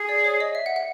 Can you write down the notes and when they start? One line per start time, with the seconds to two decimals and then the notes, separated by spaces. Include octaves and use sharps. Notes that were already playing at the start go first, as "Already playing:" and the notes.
Already playing: G#4
0.09 D5
0.24 C#5
0.40 D#5
0.55 E5
0.66 F#5
0.76 F#5